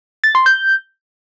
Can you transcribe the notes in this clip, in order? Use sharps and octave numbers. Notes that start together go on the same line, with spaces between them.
A6
C6
G6